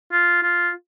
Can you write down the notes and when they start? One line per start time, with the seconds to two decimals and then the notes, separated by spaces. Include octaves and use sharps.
0.12 F4
0.43 F4